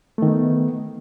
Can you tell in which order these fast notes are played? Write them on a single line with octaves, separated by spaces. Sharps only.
A3 D#3 B3